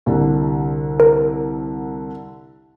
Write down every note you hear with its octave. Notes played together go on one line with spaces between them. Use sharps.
C2 D3
A#4